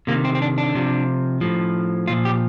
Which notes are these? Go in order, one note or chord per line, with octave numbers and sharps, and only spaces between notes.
C3 D#3 A#3
C4
C4
D4
D4
C3 F3
A2 F3
A#2 F3 F4
G4